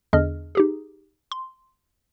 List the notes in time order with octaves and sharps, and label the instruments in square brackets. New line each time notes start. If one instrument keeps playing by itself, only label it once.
[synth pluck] E2 D3 D4 G#4 D#5 F6
D#4 G4 G#4
C6